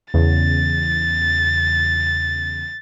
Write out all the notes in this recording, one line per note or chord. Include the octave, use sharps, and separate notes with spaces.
E2 C#3 A6